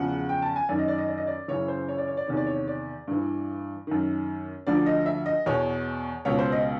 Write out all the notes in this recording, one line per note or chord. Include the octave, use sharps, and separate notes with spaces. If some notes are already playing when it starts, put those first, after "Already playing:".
Already playing: E2 C#3 F3 F#5
G5
A5
G#5
F#2 D#3 D5
D#5
D5
D#5
D5
D#5
D5
F#2 C#3 E3 C#5
C5
C#5
D5
C#5
D5
E2 C3 D#3 C#5
D5
C#5
D5
G2 E3
F#2 D#3
D2 D3 F3 D5
D#5
E5
D#5
E2 B2 C#5
C#2 B2 C#5
C5
D#5